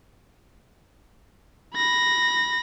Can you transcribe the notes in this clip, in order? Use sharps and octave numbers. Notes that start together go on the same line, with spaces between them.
B5 A#6